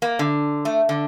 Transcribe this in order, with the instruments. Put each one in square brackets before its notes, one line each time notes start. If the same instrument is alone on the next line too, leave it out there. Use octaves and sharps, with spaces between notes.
[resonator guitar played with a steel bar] A#3
D3
A3
D3